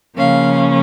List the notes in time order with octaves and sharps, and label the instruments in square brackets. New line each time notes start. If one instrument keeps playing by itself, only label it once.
[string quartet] C#3 F3 A#3 C#4 F5